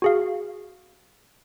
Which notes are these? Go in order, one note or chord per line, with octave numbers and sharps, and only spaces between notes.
F#4 G#4 F5